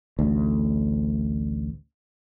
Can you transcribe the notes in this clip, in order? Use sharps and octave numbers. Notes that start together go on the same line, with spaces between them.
A1 D2